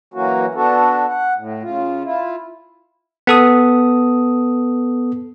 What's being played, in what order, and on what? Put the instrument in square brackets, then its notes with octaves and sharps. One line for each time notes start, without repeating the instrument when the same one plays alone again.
[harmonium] E3 F#3 A#3 C#4 F#4
B3 D4 F#4 A4
F#5
A2
C#3 F4
E4 F4
[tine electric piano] B3 A4 D#6